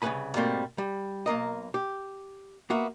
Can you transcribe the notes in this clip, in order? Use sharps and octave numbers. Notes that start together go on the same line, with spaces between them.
C2 C#3 C#4 B4 G#5 B5
G#2 B2 G3 A3 A#3 C4
G3
B1 A#3 A#4 D#5
G4
A#3 B3 F#4 E5